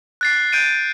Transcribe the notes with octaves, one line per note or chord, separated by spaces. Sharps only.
F#6 A6 C7
G6 D7 D#7